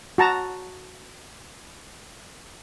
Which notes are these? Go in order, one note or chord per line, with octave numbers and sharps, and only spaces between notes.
F#4 A5 A#5